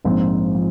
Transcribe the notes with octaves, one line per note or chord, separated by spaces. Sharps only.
A#1 G#2 F3 C4
F3